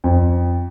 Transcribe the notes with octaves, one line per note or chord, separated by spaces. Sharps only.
F2